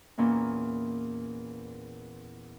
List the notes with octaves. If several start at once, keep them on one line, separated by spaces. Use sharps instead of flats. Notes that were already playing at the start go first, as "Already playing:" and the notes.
E2 A#2 A#3 C#4